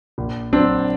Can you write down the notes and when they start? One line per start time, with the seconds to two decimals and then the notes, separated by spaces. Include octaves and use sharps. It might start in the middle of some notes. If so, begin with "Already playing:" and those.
0.18 A#1
0.52 F#3 C4 D4